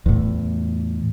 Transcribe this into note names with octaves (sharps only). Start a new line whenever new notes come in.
E2 A2